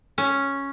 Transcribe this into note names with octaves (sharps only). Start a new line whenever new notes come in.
C#4